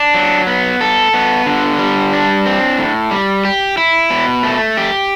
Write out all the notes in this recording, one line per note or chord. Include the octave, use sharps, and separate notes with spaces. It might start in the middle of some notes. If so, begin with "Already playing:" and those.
Already playing: D4
F#3
B3
A4
B3
D3
G3
D4
C4
A2
G3
G4
E4
B2
A3
G4